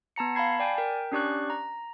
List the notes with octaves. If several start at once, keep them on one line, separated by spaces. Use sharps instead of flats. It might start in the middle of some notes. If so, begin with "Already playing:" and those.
B3 A5 A#5 C#7
F5 A5 B5 G#6 C7
D5 G5 G#5
A#4 G5
C#4 D4 G4 D5 C#6 F#6
A#5